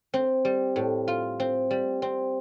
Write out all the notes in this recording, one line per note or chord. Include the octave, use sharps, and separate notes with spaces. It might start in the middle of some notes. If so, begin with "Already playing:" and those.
C4
G3
A2
F4
C4
G3
C4